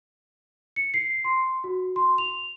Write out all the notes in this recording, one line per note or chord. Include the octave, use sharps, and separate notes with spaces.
C#7
C7
C6
F#4
C6
F7